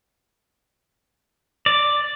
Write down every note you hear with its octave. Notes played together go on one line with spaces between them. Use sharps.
D5